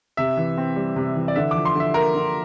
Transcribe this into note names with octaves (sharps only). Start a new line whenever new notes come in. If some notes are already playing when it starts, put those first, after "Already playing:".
C3 E5
E3
C4
G3
C3
E3
D5
D3 E5
F3 D6
C6
D3 E5
A#3 A#4
D3